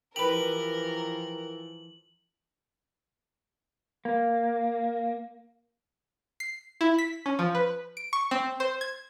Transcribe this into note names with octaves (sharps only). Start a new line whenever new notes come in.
E3 F3 G4 A#4 B4 F#7
A#3
C7
E4
B6
C#4
F3
B4
D7
C#6
C4
C5
G#6